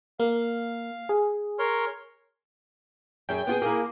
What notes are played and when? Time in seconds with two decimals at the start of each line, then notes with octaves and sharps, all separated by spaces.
0.20 A#3 F5
1.09 G#4
1.59 A#4 C#5 C6
3.29 F#2 G#4 G5
3.47 B3 F4 G#4
3.62 A#3 E4 G#4